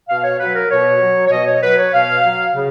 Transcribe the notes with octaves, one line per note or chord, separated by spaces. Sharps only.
B2 F5
C#5
F#3 B4
A#4
B2 C#5
F#3
C#5
B2 D#5
C#5
F#3 B4
C#5
B2 F5
F#3
C#3